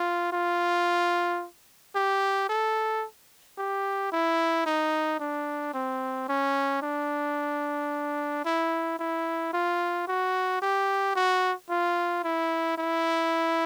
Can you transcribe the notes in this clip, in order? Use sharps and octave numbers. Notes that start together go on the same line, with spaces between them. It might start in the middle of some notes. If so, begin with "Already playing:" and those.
Already playing: F4
F4
G4
A4
G4
E4
D#4
D4
C4
C#4
D4
E4
E4
F4
F#4
G4
F#4
F4
E4
E4